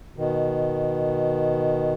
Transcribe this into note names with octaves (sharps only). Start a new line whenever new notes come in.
B2 D#3